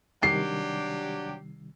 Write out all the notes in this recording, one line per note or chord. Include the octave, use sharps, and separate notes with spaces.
C3 D#3 F#3 G3 D4 G4 C7